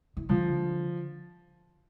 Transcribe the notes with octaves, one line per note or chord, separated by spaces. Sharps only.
E3
D3 F3